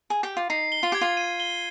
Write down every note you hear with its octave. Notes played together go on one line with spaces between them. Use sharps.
G#4
G4
F4
D#4 C7
G7
F4
G4 G#6
F4
D#7
G7